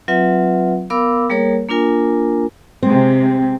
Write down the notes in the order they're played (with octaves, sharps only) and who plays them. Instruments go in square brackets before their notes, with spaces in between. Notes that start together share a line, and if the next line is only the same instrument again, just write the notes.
[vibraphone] F#3 C4 F4 B4 E5 F#5
B3 A#4 F5 B5 D6 E6
G3 A#3 G#4 A#4 C#5
A#3 D4 F4 A#4 G#5
[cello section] C3 G#3 [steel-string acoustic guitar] C4